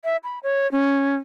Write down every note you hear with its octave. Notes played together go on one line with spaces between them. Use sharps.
E5
B5
C#5
C#4